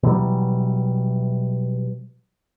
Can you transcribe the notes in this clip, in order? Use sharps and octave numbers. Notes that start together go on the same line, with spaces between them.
B2 E3 F#3 G3